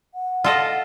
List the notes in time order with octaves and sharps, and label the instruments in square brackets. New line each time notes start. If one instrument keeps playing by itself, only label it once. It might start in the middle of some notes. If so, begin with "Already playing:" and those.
[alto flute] F#5
[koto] F4 A4 D#5